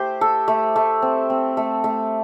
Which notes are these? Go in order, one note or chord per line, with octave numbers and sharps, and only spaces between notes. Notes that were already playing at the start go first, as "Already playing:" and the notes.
Already playing: A3 G4 C5
A4
A3
A3
C4
C4
A3
A3